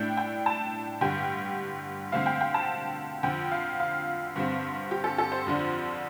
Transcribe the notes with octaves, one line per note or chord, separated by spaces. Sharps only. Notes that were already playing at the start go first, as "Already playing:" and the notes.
Already playing: A2 A3 D4 G5
G5
A5
G2 D3 G3 G5
D3 A3 C4 F5
G5
G5
A5
F2 D3 F3 G5
F5
F5
G2 D3 G3 C4
G4
A4
A4
C5
F2 D3 F3 D4